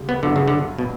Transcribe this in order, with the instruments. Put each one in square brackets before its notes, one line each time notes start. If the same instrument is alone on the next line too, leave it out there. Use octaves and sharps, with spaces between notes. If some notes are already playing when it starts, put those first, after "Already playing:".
Already playing: [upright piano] D2 C#3 G3
[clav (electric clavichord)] B3
[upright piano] G2 F#3 B3 E4 [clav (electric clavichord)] D3
[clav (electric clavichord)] C#3
D3
B2